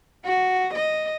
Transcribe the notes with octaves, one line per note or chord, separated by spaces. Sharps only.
F#4
D#5